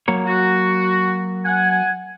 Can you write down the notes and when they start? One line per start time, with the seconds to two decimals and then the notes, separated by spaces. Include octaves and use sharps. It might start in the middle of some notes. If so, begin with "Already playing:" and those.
0.08 F#3 A#3 C#5
0.27 F#4
1.45 F#5 G#5